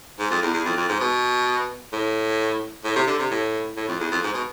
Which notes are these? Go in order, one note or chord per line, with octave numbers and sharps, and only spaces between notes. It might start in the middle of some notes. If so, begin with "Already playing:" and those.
G#2
F2
E2
E2
F2
F2
G#2
B2
A2
A2
C3
D3
C3
A2
A2
F2
E2
F2
G#2
B2